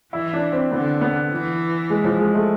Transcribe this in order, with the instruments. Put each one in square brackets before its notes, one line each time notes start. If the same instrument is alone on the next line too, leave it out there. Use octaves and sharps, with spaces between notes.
[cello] E3 [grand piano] E4
[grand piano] D4
C4
[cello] D3 [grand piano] B3
[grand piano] B3
[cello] E3
[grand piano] G#3
F3
G#3
A3